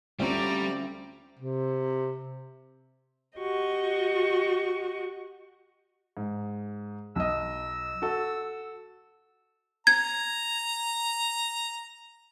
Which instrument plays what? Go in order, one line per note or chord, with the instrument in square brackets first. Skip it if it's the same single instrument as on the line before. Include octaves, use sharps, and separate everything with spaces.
[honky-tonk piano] D2 C4 [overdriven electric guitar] G3 [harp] C#4 F4 A4 [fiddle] D5 A#5
[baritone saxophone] C3
[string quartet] F#4 G4 D#5 C#6
[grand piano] G#2
[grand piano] B1 D#5 [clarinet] E6
[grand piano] F#4 A4
[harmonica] A#5 [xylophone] G#6